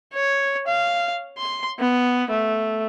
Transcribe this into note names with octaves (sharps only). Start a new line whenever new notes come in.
C#5
F5
C6
B3
A3